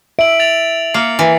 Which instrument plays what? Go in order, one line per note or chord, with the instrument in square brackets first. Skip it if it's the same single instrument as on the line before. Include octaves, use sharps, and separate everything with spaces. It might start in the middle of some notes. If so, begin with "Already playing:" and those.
[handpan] E5 [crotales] D7 F#7
[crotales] A6 F7 F#7
[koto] A#3 [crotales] C7 C#7
[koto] E3